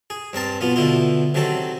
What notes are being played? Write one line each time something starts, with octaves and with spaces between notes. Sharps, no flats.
G#4
G2 C4 A#4 A5
B1 B3 F4
B2 D3 E4 F4
C3 D#3 F#3 C4 A4